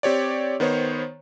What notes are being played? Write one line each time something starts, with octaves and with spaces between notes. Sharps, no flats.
C4 G4 C#5 D5
D#3 B3 C5 C#5